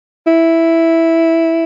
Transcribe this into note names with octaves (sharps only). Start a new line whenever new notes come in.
E4